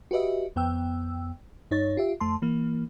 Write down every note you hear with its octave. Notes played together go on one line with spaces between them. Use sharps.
F#4 G4 B4 D#5 E5
F2 B3 G5 E6
G2 D#4 C#5 A6
F4 G4 E5
F2 A3 A5 C6
E3 A#3